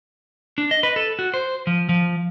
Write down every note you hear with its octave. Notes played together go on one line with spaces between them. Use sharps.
D4
D#5
B4
A4
F#4
C5
F3
F3